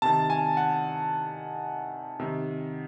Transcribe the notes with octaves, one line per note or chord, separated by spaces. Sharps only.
C3 D#3 A5
G#5
F#5
C3 D#3